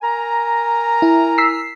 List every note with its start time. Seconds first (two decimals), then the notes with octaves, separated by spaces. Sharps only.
0.02 A#4 G#5 A#5
1.02 E4
1.38 E6 B6 C7